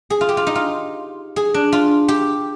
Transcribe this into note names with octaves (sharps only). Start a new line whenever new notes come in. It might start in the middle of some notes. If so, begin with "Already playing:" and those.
G#4
F4
G4
F4
D#4
F4
G#4
D4
F4
G4